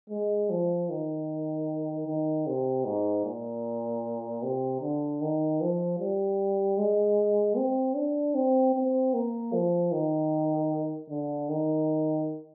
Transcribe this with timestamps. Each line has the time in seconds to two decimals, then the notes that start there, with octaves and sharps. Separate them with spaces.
0.10 G#3
0.50 F3
0.90 D#3
2.06 D#3
2.47 C3
2.85 G#2
3.25 A#2
4.43 C3
4.81 D3
5.21 D#3
5.61 F3
5.99 G3
6.78 G#3
7.56 C4
7.95 D4
8.35 C4
8.75 C4
9.14 A#3
9.53 F3
9.92 D#3
11.10 D3
11.49 D#3